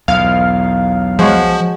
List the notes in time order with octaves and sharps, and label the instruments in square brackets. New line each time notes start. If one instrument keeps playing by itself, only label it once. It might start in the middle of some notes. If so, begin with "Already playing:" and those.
[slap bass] B1 E2 [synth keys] F5
[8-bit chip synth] F3 [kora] G#3 F#4 C#5